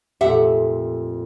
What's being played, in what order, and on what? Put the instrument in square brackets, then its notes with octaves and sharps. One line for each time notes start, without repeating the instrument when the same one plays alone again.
[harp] F2 A#2 A3 [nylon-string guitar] G4 E5 F#5